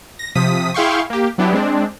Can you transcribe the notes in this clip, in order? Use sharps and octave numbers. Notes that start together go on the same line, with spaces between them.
A#6
C3 F3 D#6 B6
E4 G#4 F5 G5 C6 C#6
A#3 G4
F#3 B3 D4 E4 G4
G#3 C4 D4